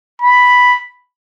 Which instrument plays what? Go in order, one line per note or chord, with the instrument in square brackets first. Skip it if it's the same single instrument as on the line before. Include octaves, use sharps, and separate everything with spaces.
[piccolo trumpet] B5